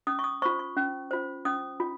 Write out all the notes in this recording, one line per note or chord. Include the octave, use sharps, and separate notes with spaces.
C#4 D#6
C#6
D#6
F4 C5 C#6
C#6
C#4
F4 C5
C#4 D#6
F4